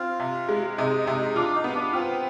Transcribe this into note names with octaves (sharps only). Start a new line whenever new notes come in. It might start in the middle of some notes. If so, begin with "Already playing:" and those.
Already playing: C4 F4
C3
G#3
C3 D#4
D#4
C3
D#4
D4 F4
D#4
B3
D4
C4 F4